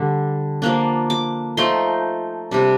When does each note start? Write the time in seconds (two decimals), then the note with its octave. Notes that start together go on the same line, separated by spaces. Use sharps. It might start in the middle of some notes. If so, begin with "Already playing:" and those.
Already playing: D3 G3 D4
0.62 F3 A#3 D4
1.10 D6
1.57 F3 A3 D#4 C6
2.51 C3 G3 D4